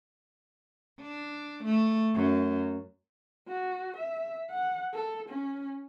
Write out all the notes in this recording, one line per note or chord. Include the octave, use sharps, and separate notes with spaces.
D4
A3
F#2
F#4
E5
F#5
A4
C#4